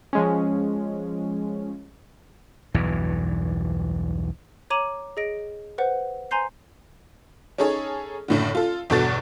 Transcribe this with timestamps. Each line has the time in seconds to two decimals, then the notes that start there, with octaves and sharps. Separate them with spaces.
0.13 F3 G#3 C#4
2.74 B1 E2 G2 E3
4.70 C#5 A#5 D6 D#7 F#7
5.17 G#4 D#5 A#6 D7
5.78 B4 C5 F#5
6.31 C5 G#5 A#5 C6 G6 C7
7.58 C#4 D#4 G#4 A4 C#5
8.28 F#1 A2 D3
8.55 F4 A4
8.90 G1 E2 B2 F#4 A4 A6